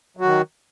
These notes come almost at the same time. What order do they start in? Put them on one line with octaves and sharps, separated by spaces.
F#3 F#4 D#3